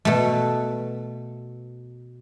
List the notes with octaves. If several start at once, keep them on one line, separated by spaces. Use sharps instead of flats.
B2 A3